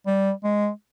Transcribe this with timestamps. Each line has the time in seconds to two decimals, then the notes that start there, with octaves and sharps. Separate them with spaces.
0.06 G3
0.44 G#3